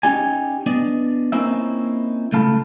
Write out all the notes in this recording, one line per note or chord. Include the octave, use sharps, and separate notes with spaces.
C#4 D#4 G4 D5 G#5
B3 D4 D5 D#5
A#3 C4 C#4 D#4 E4 E5
C#2 A2 A3 F5 A5 B5